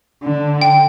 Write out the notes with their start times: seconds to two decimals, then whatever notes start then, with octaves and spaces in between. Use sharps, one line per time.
0.23 D3
0.61 G5